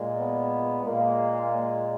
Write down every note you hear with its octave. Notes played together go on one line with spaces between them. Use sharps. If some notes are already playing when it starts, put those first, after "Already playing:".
Already playing: A#2 G#3
B3
A#2 G#3 A#3